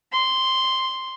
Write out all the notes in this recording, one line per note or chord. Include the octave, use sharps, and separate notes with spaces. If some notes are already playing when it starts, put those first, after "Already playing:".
C6